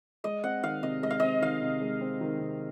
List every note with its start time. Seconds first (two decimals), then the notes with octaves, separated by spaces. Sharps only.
0.24 G#3 D#5
0.44 C4 F#5
0.63 D#3 F5
0.83 C3 D#5
1.03 G#3 D#5
1.10 F5
1.20 C4 D#5
1.42 D#3 F5
1.62 C3
1.82 G#3
2.01 C4
2.21 D#3
2.40 C3